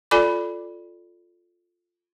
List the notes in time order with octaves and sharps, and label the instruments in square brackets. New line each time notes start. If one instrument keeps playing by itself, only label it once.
[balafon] F4 A4 D5 G#5 B5 D6